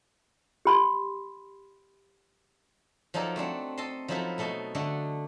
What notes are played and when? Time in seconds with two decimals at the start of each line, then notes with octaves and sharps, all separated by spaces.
0.65 G4 B5 C6
3.14 F3 F#3 D#4 A4 A#4 D5
3.36 A3 C4 D4 F#5
3.78 A4 D#5 A5 C6
4.08 F3 F#3 D#4 E4 A4 B4
4.38 B2 A3 A4 D#5 A5
4.75 D3 A3 D4 D#5 F#5